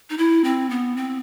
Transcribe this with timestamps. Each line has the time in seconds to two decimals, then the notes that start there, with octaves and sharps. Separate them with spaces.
0.10 D#4
0.18 E4
0.44 C4
0.70 B3
0.96 C4